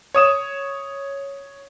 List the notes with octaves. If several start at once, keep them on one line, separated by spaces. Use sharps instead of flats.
C#5 D#6 E7